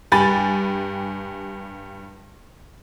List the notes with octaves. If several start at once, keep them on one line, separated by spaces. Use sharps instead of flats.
G2 G4 G#5 B5 A6